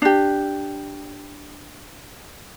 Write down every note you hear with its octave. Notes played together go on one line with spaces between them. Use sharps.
D4 G4